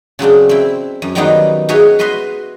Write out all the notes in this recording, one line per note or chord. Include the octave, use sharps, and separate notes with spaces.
C#3 F#3 C4 D4
C4 E4
F#2
D#3 F#3 G3 A#3 B3 D#4
D#4 F#4 G#4 C#5 E5
F#4 B4 D#5 E5 C6